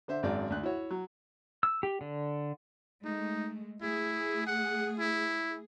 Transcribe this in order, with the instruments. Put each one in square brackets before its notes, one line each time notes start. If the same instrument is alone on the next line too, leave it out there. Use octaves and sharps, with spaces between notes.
[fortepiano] D3 C5 E5
G#1 F#2 G#3 D5
D2 F#6
E4 F#4 C#5
F#3
[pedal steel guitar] E6
G4
D3
[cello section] G#3 A3 [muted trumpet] D#4
[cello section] A3 G#4 [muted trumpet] E4
[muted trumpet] F#5
E4